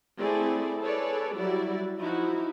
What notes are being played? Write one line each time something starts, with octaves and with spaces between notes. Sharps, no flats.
A3 C4 E4 G#4 D5
G#4 A4 B4 C#5 D5
F#3 G3 E4 F#4 D5
F3 D#4 E4 F#4